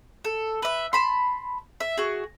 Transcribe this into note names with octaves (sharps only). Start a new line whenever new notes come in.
A4
B4 E5
A5 B5 C6
E5
F#4 G#4